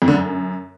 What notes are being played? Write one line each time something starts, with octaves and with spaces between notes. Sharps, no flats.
F2
D3
F#2